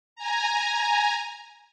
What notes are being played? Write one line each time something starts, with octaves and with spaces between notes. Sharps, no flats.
G#5 A#5